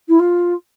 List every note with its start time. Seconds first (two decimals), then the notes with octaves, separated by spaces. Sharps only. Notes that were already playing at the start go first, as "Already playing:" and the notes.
0.08 E4
0.19 F4